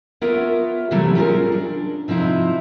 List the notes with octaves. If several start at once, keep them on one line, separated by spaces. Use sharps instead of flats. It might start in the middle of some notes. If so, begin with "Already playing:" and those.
B3 F4 A#4 C#5 E5
C3 E3 F#3 G3 A3 C4
G3 C#4 F4 G4 G#4 A#4
D4
C3 F3 C4 D#4 E4